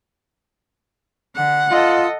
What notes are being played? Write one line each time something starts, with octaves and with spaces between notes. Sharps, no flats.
D3 F#5
F4 A4 D#5